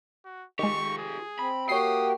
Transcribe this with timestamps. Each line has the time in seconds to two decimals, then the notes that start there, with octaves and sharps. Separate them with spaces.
0.25 F#4
0.59 D#3 G#3 F4 G4 C#6
0.98 G#4
1.39 C4 B5
1.69 A#3 F#4 G4 C#5 G5 D#6 C7